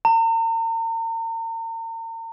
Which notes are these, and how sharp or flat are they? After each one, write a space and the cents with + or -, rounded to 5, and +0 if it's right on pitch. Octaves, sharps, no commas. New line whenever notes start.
A#5 -40